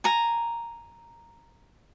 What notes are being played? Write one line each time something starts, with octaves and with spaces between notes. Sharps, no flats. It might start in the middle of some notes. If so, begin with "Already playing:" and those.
G#5 A#5